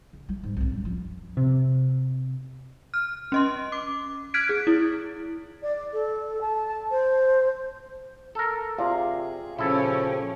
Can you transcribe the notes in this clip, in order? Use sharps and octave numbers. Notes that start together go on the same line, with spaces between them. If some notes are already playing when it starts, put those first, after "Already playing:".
C#3
G3
G#2
C2 G#2
F#2
F3
C3
F6
C#4 D#5 C6
D6
F6 F#6 G#6 B6 D7
G#4
E4
D5
A4
A5
C5
A4 A#4
C3 F4 G#4 D5 F5
A#2 C#3 F3 C#4 E4 G4 A4 C#5